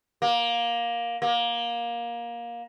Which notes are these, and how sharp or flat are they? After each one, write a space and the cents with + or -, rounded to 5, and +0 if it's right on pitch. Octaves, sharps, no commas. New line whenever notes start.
A#3 +15
A#3 +20